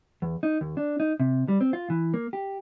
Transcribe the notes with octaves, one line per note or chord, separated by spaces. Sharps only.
E2
D#4
D#2
D4
D#4
C3
G3
C4
F4
E3
A#3
G4